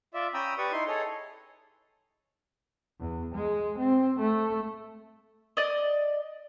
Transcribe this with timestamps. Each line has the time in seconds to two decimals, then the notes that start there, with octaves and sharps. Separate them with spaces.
0.14 F4 D5 E5
0.34 C#4 G5 A#5 B5 D#6 E6
0.58 G4 B4 D5 C#6 D#6
0.72 D#4 E4 C6
0.88 G#4 A4 C#5 D#5
3.00 E2
3.35 G#3
3.79 C4
4.20 A3
5.57 D5 D#5